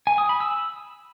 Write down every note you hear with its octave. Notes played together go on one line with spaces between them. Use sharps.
G#5
D#6
B5
E6